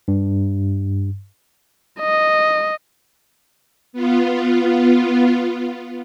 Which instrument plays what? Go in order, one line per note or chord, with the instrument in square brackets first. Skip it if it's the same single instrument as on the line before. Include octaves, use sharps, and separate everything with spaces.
[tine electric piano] G2
[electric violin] D#5
[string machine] B3 F4